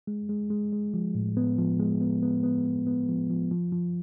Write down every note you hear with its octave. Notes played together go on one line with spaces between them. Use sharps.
G#3
G#3
G#3
G#3
F3
A2
B3
F3
G#3
B3
B3
B3
B3
B3
F3
F3
F3
F3